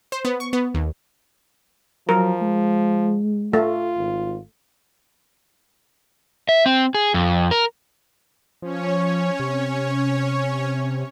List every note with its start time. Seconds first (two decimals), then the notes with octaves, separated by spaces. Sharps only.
0.12 C5
0.25 B3
0.40 C#6
0.53 B3
0.75 D#2
2.09 F3 F#3 A#4
2.42 G#3
3.53 A3 F4
3.96 G#1
6.49 E5
6.66 C4
6.94 G#4
7.14 F2
7.51 A#4
8.62 F3 C#4 C#5
9.40 C3